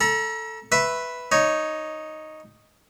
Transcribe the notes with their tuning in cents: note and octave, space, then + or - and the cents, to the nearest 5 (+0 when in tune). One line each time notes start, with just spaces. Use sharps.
A4 +5 A#5 +40
B4 +0 E5 +0 C#6 -45
D#4 +0 C#5 +0